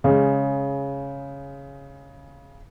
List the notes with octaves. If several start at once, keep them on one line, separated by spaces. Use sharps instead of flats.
C#3 G#3